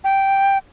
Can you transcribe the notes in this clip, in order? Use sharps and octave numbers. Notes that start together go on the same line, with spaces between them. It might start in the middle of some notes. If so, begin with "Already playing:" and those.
G5